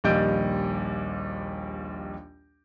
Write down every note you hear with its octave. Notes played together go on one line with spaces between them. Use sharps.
A#1 D#2 G3 D#5 G6 D7